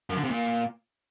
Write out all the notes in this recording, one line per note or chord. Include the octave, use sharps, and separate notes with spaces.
F#2
D3
C3
A#2